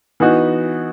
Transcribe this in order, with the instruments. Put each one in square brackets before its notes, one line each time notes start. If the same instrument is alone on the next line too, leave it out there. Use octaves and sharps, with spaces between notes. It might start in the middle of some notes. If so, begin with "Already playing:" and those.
[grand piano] E3 B3 D#4 F#4